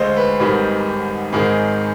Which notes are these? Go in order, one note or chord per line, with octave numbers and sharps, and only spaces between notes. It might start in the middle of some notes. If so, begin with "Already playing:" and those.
Already playing: D2 D3 G#3 C5 D#5 F5
B4
G#1 G#2 D#3 G3
G#1 G#2 D#3 G#3 G#4